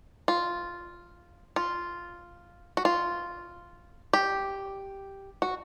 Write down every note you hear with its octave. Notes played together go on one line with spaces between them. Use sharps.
F4
F4
F#4
F4
G4
F#4